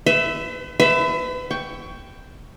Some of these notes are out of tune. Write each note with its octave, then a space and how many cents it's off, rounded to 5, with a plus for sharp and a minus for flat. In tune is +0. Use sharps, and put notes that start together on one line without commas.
B4 +40 E5 +0
B4 +35 E5 +0
G5 +0 C#6 +20